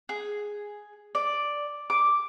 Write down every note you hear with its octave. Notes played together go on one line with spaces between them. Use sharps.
G#4
D5
D6